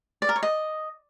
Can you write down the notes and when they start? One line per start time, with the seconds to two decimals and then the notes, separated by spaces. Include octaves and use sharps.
0.22 D5
0.29 A#4
0.36 C#5
0.43 D#5